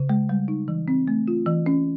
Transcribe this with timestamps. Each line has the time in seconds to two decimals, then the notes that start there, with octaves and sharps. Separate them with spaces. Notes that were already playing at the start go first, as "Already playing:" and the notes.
Already playing: C#3
0.09 G#3
0.29 G3
0.48 D#4
0.68 E3
0.88 C4
1.08 A3
1.28 F4
1.46 E3
1.66 C#4